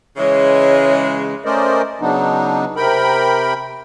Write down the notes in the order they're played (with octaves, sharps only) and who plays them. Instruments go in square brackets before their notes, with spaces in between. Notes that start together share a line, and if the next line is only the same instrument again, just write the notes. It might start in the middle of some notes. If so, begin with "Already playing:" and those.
[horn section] C#3 E3 G#3 [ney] C#5
[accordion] A3 C#4 A#4 C5 D5 D#5
C#3 F#3 B3 D4 D#4
C3 A#4 G5 B5